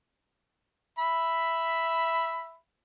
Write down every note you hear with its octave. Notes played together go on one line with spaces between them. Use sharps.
E5 B5